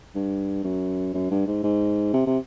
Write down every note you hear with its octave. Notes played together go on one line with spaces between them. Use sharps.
G2
F#2
F#2
G2
G#2
G#2
C3
C3